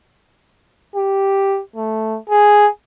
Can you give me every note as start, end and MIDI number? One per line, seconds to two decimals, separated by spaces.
0.96 1.61 67
1.76 2.19 57
2.29 2.68 68